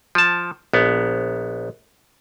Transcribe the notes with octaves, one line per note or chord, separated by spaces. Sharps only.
F3 A5
A#1 B3